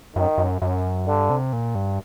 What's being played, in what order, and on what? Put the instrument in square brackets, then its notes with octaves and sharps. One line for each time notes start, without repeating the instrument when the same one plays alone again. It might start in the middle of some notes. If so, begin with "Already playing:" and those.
[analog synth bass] F#2 [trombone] D#3
[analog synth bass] F#2
F#2
[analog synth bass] G2 [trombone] D3
[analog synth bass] C3
A#2
G2